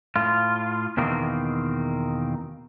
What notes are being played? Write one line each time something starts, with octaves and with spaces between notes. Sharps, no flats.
A2 F4
E2 B2 D#3 A#3 C4